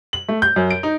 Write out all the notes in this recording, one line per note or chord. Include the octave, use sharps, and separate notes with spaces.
F#7
A3
G6
F#2
D7
D#4